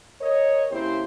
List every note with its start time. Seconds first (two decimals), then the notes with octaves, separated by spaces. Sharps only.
0.20 A#4 C#5 D#5
0.71 C#3 A#3 C4 E4 G4 C5